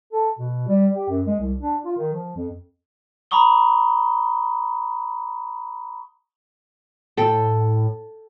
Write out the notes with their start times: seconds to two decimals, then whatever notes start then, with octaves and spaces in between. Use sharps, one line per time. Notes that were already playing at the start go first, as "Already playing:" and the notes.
0.12 A4
0.39 B2
0.68 G3
0.95 G4
1.09 F#2
1.26 G#3
1.39 C2
1.60 D4
1.85 F4
1.97 D#3
2.13 F3
2.36 F2
3.31 A#5 B5 C#6 D#6 G7
7.17 A2 A4 G5